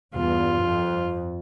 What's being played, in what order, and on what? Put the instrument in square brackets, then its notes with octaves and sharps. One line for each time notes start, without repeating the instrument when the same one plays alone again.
[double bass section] E2 G2 [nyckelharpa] F4
[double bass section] F2